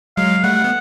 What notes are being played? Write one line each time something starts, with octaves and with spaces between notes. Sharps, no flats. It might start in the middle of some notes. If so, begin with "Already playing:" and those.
F#3 G#3 F5
G3 A3 F#5
B3